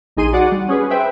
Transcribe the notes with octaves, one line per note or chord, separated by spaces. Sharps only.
A#1 D#4 G#4 C6 D#7
F#4 D5 F#5 D6
G3
C#4 G#4 B4
B4 C5 E5 G5